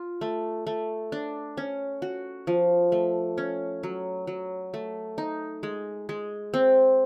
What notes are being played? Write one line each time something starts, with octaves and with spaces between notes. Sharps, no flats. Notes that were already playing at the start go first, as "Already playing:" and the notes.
Already playing: F4
A3
A3
D4
C#4
F#4
F3
A3
C#4
F#3
F#3
A3
D#4
G#3
G#3
C4